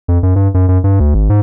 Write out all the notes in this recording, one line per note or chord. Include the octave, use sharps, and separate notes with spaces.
F2
F#2
G2
F#2
F#2
G2
D2
G#1
G#2